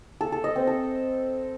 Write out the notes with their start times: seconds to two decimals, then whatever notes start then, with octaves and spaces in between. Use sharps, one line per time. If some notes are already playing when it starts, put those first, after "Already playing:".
0.21 A4
0.32 A4
0.44 D#5
0.56 C4
0.67 A4